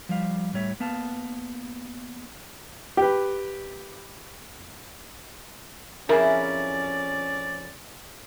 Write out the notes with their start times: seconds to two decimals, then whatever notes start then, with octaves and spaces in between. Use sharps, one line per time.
0.09 F3 G3 F5
0.53 A2 G3 C#5 E5
0.80 A#3 B3 F5 A5
2.97 G4 B4
6.09 F2 C#4 E4 G#4 A#4 D5